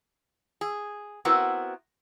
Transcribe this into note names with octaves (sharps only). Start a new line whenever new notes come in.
G#4
B3 C4 E4 F#4 A#4